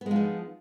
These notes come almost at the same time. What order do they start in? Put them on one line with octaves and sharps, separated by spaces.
B3 G#3 F3 D#4